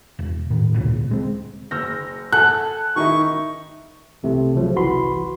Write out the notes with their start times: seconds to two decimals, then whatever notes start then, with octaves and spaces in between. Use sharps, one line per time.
0.19 E1
0.50 A1 A2 D#3
0.75 D#1 D2 A#2 C#3
1.11 G#3 C4
1.71 F#1 C#6 E6 F6 G6 A#6
2.33 A4 F#5 G#5 A5 F#6
2.96 D#3 D#4 E4 C#6
4.23 C2 C3 E3 A3
4.55 C#3 F3 F#3
4.76 G1 C2 E3 F#4 B5 C6